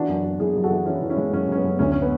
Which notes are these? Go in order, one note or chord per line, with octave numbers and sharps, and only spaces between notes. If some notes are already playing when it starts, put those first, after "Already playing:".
Already playing: E3 D4 F#4
F#2
F#2
F#2 E4 G#4
F#2
F#4 A4
E3
E3 C#4 E4
E3
C#4 E4
G#3
F#2 C#4
F#2 C#4
B3
F#2
D2 C#4
C#4
B3